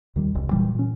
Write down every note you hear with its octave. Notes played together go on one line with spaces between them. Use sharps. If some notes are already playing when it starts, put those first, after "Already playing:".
D#2 D#3 G3
E1 C2
A#2 E3 F#3 G3
A#2 C#4